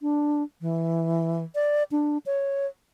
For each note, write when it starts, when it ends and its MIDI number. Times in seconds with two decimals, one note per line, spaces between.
0.01 0.43 62
0.61 1.44 52
1.55 1.83 74
1.92 2.18 62
2.26 2.67 73